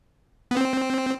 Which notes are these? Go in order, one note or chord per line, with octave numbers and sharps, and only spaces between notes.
B3
C4